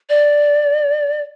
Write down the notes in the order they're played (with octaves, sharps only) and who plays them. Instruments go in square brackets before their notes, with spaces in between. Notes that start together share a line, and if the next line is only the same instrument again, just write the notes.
[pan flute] D5